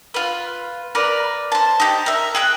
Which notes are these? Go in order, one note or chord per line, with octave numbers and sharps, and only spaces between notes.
F4 B4
A#4 B4 D5
C5 A5
D#4 G4
A#4 E5
G#4 G5 F#6